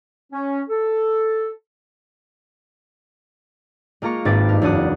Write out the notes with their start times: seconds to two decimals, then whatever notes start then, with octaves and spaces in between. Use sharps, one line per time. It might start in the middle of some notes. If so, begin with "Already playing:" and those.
0.33 C#4
0.69 A4
4.02 G#3 A#3 F4 A#5 C#6
4.25 G#1 G#2 C4 B4 D6 A6
4.49 G2 A#4
4.62 F#1 E2 D4 F#4 D#6 F#6